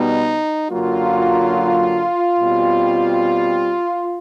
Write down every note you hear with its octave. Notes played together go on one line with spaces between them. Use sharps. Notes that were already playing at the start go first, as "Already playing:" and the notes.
Already playing: B2 G3 B3 D#4
F#2 D3 F#3 A#3 F4
B2 G3 C4